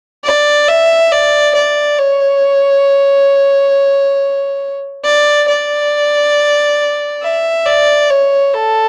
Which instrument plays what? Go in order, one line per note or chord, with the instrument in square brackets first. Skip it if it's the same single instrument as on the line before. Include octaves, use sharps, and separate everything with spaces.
[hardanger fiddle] D5
E5
D5
D5
C#5
D5
D5
E5
D5
C#5
A4